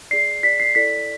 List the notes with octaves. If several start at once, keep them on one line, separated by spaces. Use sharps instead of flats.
G#4 D5 C7
G#4 D5 B6
C7
E4 A4 D5 B6